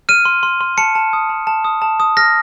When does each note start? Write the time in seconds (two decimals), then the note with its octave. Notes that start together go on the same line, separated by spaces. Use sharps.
0.09 F6 D#7
0.25 C6
0.43 C6
0.61 C6
0.78 A5 C#7
0.95 A5
1.13 D#6
1.30 A5
1.47 A5
1.64 D#6
1.82 A5
2.00 D#6
2.17 F6 A#6